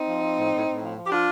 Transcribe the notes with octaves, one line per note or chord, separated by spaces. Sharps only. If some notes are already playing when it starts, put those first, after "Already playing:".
Already playing: C4 D#4
F3
F3
A2
A2
A2
F3
F3
G4
D4 F4